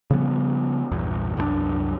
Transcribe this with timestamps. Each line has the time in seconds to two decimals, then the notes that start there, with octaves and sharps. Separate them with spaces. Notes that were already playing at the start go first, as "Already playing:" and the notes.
0.11 C#3 F3 G3 B3
0.91 A#1 E2 G2
1.37 C2 F#2 G3 D4